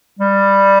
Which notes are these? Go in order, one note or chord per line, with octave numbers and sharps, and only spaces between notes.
G3